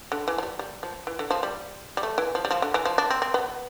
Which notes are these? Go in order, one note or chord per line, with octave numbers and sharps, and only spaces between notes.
D3
E3
F3
G3
G3
F3
E3
D3
F3
G3
G3
A3
E3
F3
G3
F3
D3
E3
F3
D4
C4
C4
B3